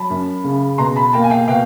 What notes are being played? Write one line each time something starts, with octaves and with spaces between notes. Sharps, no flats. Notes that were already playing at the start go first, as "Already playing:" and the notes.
Already playing: F#3 A5 B5
F#2
C#3
B2 A#5 C6
A5 B5
A#3 G5 A5
G#5
F5 G5
B2 F5 G5